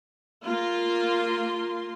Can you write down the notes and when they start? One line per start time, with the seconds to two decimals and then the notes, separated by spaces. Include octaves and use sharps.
0.45 A#3 F4 C6